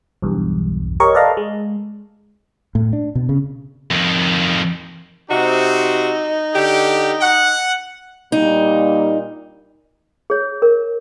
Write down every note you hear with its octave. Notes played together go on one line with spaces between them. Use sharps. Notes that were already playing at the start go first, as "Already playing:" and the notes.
B1 E2 G2
G4 A#4 C#5 D#5 C#6
A4 B4 D5 D#5 F5 A#5
G#3
A2
D4
B2
C#3
F2 D#3
C3 D#4 F#4
D3 G4
F#5
A#2 G3 A#3 D#4
G#4 C#5
A#4